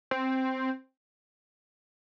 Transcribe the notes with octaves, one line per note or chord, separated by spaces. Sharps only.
C4